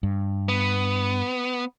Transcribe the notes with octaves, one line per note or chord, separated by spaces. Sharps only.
G2
B3